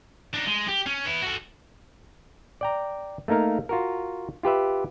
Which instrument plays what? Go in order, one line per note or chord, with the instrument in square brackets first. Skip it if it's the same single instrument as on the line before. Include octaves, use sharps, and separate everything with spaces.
[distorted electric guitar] D4 D#4
G#3
G4
C#4
B3 E4
F#4 A4
[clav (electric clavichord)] D5 G5 A#5
A3 A#3 D#4 A#4 F5
F4 F#4 A#4
F4 G4 B4 E5